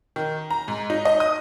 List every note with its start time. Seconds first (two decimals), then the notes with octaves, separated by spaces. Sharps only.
0.16 D#3
0.50 A#5
0.68 G#2
0.90 D#4
1.05 D#5
1.20 D#6